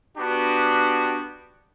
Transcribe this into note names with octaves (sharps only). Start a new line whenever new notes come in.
B3 D4 F#4 G4